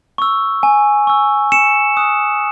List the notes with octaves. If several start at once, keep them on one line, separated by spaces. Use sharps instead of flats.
C#6 E6
G#5
C#6 E6
G#5 C#7 E7
D#6 F#6